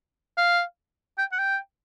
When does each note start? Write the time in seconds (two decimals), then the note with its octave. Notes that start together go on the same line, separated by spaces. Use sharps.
0.38 F5
1.18 G5
1.32 F#5
1.39 G5